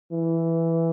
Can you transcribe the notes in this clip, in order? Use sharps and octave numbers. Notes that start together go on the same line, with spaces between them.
E3